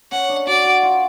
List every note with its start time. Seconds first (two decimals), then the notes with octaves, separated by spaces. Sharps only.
0.12 C#4 F#5
0.29 D4
0.47 F#4 D5
0.64 F#4
0.83 F4